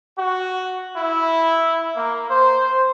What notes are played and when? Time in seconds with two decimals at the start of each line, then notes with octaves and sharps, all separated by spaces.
0.17 F#4
0.97 E4
1.96 A#3
2.30 C5